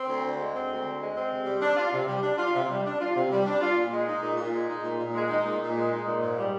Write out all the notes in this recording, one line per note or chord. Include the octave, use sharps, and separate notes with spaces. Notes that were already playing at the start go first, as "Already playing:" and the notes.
Already playing: C4
D2
D3
G#3
C4
D2
D3
G#3
C4
C3
G3
D4
F4
C3
G3
D4
F4
C3
G3
D4
F4
C3
G3
D4
F4
A#2
G#3
D#4
A#2
A#2
G#3
D#4
A#2
A#2
G#3
D#4
A#2
A#2
G#3
D#4
A#2
G#2
G3